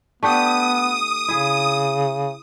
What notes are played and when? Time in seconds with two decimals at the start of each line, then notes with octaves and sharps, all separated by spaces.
0.23 A3 B3 D4 G4 D#6
1.28 C#3 E4 G#4